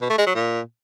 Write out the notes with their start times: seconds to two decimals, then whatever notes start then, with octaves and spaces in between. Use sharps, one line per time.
0.02 B2
0.10 A3
0.18 G#3
0.26 F#3
0.35 A#2